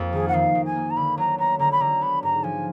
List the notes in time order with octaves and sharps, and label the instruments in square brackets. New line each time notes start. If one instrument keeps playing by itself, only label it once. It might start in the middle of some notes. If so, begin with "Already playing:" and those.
Already playing: [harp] F2 A#3
[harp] D#3 [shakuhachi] G#4
[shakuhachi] F#5
[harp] D#3 [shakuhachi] F5
[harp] D#3
[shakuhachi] G#5
[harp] A#3
[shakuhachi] A#5
[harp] D3 [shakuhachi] B5
[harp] F#3 [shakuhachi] A#5
[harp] B3 [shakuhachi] A#5
[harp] D3 [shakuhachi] A#5
[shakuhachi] B5
[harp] D3 [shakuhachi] A#5
[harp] B3 [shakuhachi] B5
[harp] G#2 [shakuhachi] A#5
[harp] F3 [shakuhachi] G#5